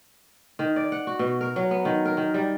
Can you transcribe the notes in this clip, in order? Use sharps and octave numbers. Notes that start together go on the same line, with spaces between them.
D#3
D5
F#5
F#4
B2
A#4
F#3
B3
D#3
A#4
D#3
G3